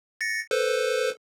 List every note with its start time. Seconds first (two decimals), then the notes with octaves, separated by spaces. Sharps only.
0.21 A6 A#6 C#7
0.51 A4 B4 C5